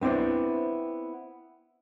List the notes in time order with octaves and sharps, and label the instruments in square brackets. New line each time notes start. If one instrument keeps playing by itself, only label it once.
[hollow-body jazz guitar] B3 C4 D4 E4 C5